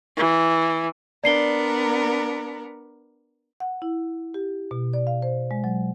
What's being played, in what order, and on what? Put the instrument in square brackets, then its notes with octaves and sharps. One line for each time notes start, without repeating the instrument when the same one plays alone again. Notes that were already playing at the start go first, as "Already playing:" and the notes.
[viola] E3
[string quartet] B3 D4 A#4 [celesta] D5 C7 G7
[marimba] F#5
E4
G4
B2
D5
F5
C5
G#3
F#3